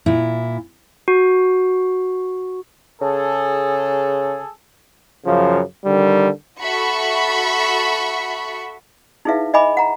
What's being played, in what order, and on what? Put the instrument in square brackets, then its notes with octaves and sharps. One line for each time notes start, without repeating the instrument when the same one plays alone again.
[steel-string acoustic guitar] A#2 E4
[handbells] F#4
[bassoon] C#3 [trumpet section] G#4 A4
[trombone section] F#2 C#3 F3
D3 D#3 G3
[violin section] F#4 A4 E5 B5 C#6
[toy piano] D#4 E4 G#4 B4 E5 F5
D#5 E5 G#5 B5 D6
F#5 A#5